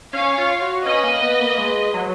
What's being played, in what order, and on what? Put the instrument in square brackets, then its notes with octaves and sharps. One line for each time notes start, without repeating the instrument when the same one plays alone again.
[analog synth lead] C#4 [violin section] C#5 F5
[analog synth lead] F4
F#4
[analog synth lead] C#4 [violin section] B4 D#5
[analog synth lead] A#3
B3
A#3
G#3
F#3